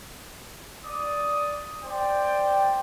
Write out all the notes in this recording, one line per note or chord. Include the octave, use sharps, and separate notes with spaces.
D5 D#6
C5 D5 G5